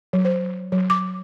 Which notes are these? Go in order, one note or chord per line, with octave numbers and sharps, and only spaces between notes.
F#3
C5
F#3
D6